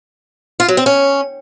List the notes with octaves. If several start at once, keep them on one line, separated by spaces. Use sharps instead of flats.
F4
F#3
C4
C#4